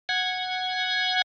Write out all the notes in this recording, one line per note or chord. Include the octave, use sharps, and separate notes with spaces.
F#5 G#6